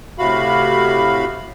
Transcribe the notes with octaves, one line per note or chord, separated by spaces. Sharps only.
A2 C3 F#4 F5 B5